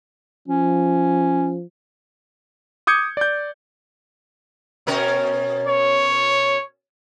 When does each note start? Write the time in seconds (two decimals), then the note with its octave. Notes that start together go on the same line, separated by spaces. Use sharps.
0.48 F3 C#4
2.87 D6 D#6 G6 G#6 C#7
3.17 D5 G6
4.87 B2 C#4 A#4
5.67 C#5